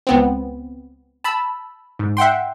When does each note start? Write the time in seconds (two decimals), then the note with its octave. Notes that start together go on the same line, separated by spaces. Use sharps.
0.07 C#2 B3 C4
1.24 A5 B5 E6
1.99 G#2
2.17 E5 F#5 G5 C6